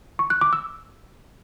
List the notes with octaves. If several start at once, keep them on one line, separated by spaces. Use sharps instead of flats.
C#6
F#6
D6
E6